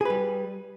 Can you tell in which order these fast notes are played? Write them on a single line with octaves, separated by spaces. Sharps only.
G#4 B4 G3